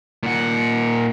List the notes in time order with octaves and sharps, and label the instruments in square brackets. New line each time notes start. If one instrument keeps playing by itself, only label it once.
[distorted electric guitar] A#2 F#5